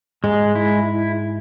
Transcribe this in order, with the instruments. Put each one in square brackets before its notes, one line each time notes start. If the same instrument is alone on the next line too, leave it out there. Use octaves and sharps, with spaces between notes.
[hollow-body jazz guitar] G#2 [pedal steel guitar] G#3
[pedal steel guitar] E4